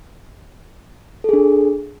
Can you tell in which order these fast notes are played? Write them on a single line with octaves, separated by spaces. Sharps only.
A4 G#4 D4